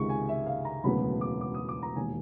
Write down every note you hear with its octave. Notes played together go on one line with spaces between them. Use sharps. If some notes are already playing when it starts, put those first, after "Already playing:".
Already playing: C#2 C3 D#3 G#3 C#6
G#5
E5
F5
A#5
E1 D2 C#3 F#3 B3 B5
D6
D6
D#6
D6
A#5
E1 D#2 D#3 G#5